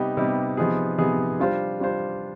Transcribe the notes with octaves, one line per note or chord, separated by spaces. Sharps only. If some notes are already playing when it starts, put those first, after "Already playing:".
Already playing: C3 G3 B3 D#4 G4
C3 G3 B3 D#4 G4
C3 F3 B3 D#4 G#4
C3 F3 B3 D#4 G#4
G3 D4 F4 C5
G3 D4 F4 C5